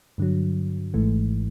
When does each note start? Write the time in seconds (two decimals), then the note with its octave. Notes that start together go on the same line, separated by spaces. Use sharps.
0.18 G2 D3 F#3
0.94 G#1 G#2 E3 A3